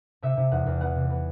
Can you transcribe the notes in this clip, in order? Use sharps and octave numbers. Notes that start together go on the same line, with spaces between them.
C3 E5
C3
E2 F#5
E2
B3 F#5
C3
B3